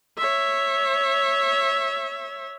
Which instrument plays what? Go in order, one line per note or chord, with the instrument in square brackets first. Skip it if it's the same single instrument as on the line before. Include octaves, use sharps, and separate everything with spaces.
[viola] C#5 E5